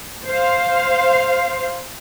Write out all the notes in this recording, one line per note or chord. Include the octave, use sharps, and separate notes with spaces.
C5 F5